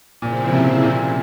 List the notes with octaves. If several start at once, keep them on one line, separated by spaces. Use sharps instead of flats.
A#2 C#3 F3 C4 E4
C3
A#2